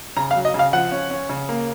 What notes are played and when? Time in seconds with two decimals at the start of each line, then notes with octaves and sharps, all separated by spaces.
0.17 C#3 A#5
0.31 F5
0.35 F#3
0.45 D#5
0.54 C#3
0.59 F5
0.73 F3 F#5
0.92 C#4
1.11 C#4
1.29 C#3
1.49 A#3